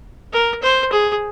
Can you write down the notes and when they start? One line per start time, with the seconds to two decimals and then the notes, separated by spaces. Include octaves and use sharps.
0.33 A#4
0.63 C5
0.92 G#4